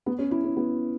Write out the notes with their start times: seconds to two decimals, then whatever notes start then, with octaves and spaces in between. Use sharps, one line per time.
0.06 B3
0.19 C#4
0.31 E4
0.44 C#4
0.57 B3